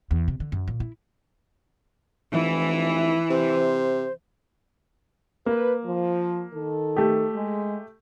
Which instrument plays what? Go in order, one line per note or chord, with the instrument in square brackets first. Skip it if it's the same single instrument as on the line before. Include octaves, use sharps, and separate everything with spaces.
[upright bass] E2
C3
D3
F#2
A#2
E4
[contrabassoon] F1 [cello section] E3
[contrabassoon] C3 [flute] C5
[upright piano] A#3 [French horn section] B4
[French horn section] F3
D#3 A4
[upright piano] A3 G4
[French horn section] G#3